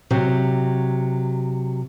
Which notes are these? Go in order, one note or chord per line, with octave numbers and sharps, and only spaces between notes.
C3 F#3 C4